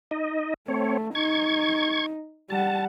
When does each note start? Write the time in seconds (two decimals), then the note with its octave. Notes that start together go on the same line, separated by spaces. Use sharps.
0.11 D#4 D#5
0.68 A3 C4 C#5
1.15 D#4 C#6 G#6
2.50 G3 F#5 A5